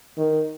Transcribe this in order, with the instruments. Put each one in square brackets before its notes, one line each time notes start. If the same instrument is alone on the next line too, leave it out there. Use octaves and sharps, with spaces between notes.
[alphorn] D#3